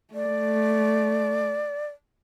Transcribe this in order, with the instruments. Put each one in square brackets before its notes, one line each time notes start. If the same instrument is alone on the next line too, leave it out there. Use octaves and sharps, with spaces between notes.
[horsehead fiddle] A3 [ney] D5